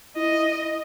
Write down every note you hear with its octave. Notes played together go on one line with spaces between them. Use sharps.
E4 D#5